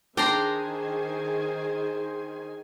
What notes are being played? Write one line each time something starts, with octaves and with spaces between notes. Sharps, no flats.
D#3 D4 G#4 C5 G5 G#5 A#5 C6